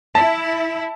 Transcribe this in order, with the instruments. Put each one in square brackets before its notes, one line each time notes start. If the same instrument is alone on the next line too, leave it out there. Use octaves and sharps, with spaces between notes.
[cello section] E4 [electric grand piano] A5